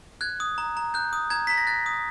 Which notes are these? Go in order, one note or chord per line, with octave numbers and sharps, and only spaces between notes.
F#6 G#6
D#6
A#5
A#5
F#6 G6
D#6
A#5 G#6
A#5 B6
A#6
F#6 A6
D#6